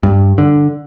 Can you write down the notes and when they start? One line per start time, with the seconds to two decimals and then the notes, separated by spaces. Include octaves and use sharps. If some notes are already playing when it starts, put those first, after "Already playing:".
0.03 G2
0.38 D3